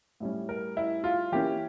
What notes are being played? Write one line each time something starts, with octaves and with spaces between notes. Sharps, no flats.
A2 G3 C#4
A#4
E4
F4
E3 A#3 C#4 G4